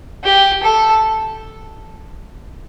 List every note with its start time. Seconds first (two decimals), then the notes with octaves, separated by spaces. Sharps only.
0.24 G4
0.63 A4